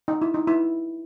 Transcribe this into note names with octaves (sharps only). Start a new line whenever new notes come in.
D#4
E4
D#4
E4